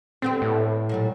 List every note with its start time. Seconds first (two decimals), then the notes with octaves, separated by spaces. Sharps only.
0.22 D3 B3 C4 G4
0.42 A2
0.89 A#2 F#3 G3